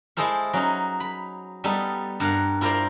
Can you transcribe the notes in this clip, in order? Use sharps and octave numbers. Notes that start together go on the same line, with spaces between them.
G#3 E4 G#4 A4 C5 F5
F#3 C#4 D#4
B5
G3 B3 D#4 A4
G2 A#4 F5 F#5
E4 F4 A#4 C5 D5 F5